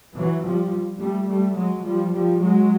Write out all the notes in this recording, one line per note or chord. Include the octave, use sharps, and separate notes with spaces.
E3 F#3
F3 G3
G3 A3
G3 A3
F#3 G#3
F3 G3
F3 G3
F#3 G#3